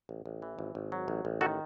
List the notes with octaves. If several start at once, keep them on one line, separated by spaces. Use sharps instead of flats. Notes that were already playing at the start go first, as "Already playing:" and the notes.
A1
A1
E3
G#1
G#1
F#3
A1
A1
D#3 F#4 A4